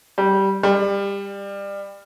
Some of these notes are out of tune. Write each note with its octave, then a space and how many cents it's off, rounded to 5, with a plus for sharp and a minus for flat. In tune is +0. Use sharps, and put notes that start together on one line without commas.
G3 -10
G3 +25